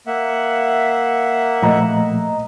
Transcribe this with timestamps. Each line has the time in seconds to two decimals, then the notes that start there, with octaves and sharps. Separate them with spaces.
0.07 A#3 E5 F#5
1.62 A#2 F3 A3 D#5 A#5